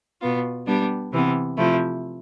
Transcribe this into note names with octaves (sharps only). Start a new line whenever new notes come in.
B2 B3 F4
G3 B3 D4 G4
C3 E3 B3
C3 F3 A3 E4